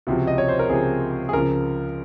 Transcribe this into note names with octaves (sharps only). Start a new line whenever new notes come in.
C#2 C3 F3 F#4
D#5
C#5
C5
A#4
C#2 C3 F3 G#4
G#4
C#2 C#3 F3 A#4